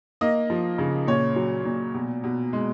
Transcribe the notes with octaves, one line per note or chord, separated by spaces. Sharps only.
A#3 D#5
F3
C#3
A#2 C#5
F#3
A#2
B2
B2
G#3